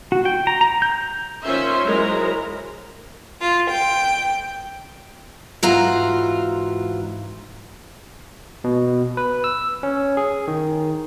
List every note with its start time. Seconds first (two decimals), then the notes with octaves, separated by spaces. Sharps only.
0.12 F#4
0.25 G5
0.47 A#5
0.61 A#5
0.82 G6
1.44 D#3 C#4 F4 C5 E5 C6
1.85 F#3 G#3 E4 A#4 C5 A#5
3.40 F4
3.70 G5
5.63 G#2 E3 F4 F#4 A#5
8.64 B2
9.17 B4
9.44 E6
9.83 C#4
10.17 G#4
10.48 D#3